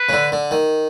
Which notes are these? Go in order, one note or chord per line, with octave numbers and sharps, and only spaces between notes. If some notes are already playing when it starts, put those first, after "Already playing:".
Already playing: B4
C#3
D3
D3
D#3